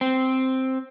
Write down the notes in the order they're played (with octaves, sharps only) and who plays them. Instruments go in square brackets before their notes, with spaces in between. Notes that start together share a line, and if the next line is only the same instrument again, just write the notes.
[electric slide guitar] C4